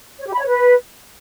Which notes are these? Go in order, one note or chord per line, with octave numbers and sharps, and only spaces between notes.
C#5
G4
B5
C#5
B4